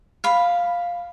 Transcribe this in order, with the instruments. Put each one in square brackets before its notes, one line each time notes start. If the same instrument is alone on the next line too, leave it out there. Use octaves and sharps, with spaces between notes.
[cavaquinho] F5 B5